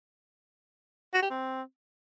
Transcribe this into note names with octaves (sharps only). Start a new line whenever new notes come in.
F#4
G4
C4